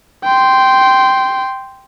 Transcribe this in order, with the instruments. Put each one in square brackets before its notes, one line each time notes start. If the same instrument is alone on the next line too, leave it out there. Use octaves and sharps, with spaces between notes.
[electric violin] G5 C6